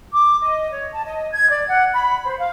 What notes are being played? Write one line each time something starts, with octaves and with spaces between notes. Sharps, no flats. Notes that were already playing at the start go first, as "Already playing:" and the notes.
D6
D#5
C#5
A5
D#5
G#6
D5
F#5
B5
C5
F5